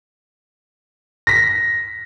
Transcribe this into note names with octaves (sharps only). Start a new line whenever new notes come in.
A#6 B6